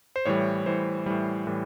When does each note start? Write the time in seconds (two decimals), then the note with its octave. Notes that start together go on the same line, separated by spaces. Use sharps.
0.16 C5
0.26 A2 E3 G3 C#5
0.66 A2 E3 G3 C5
1.06 A2 E3 G3
1.47 A2 E3 G3